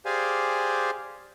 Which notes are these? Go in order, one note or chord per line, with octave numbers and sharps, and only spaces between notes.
G4 G#4 C5 D5 F5 G#5